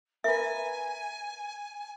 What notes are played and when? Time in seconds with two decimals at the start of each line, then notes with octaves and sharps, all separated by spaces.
0.24 A#4 B4 E5 G#5